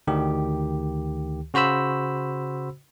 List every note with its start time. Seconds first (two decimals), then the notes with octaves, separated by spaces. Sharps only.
0.07 D2 D#3 G4
1.54 C#3 F#4 C5 B5 E6